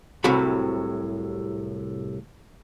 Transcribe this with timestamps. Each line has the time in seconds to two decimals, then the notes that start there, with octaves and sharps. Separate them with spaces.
0.24 C2 A2 C3 F#3 F#4 B5